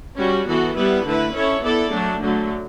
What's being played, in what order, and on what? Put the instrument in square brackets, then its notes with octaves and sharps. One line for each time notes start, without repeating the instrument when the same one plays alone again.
[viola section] G3 C#4 F#4
E3 B3 F#4 A4
G3 B3 E4 B4
D3 A3 E4 B4
C#4 E4 A4 C#5
B3 E4 A4 D5
F#3 A3 D4
D3 F#3 A3